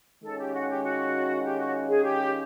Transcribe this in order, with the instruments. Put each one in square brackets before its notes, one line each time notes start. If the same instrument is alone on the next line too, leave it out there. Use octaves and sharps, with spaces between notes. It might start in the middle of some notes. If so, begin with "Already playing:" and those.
[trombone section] D#3 G#3 C#4 F4 [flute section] A4
[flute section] G4
F#4
G4
F#4
G4
F#4
G#4
G4